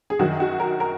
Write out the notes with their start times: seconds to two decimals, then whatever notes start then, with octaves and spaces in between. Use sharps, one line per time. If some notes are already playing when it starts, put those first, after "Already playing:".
0.10 G#4
0.19 F#2 D#3 F#3 F#4
0.40 F#4
0.60 A#4
0.80 A#4